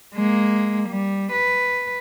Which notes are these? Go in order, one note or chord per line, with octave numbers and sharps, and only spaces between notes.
G#3 A#3
G3
B4